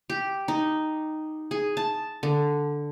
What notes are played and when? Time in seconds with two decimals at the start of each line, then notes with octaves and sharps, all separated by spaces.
0.10 G4
0.48 D#4
1.51 G#4
1.77 A5
2.23 D3